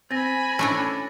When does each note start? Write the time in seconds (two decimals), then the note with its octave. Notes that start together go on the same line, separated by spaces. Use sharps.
0.11 C4 G#5 B5 A6 A#6
0.59 A3 C#4 D4 E4 A4